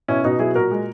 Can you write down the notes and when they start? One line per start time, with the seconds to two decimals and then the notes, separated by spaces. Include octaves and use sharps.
0.08 B2 C#4 E4
0.24 B2 D#4 F#4
0.39 F#3 E4 G#4
0.55 A#2 F#4 A#4
0.71 G#3